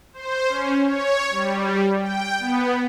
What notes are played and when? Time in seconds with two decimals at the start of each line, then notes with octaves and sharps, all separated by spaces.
0.13 C5
0.49 C#4
0.85 C#5
1.31 G3
1.99 G5
2.40 B3